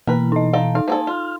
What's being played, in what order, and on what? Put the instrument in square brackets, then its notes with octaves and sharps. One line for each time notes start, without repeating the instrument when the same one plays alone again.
[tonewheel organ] B2 E3 [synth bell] A#3 [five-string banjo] A#4 B4
[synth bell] D#4 D#5
[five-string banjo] D#4 A4 [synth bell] F5
[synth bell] D#4 [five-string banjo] F5
[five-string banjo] A#3 G#4 A4 [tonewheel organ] C5
[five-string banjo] F4 [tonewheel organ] F6